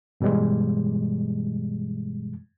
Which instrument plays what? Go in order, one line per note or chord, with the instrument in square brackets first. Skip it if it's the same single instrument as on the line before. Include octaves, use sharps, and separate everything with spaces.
[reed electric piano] G2 B2 E3 G3 G#3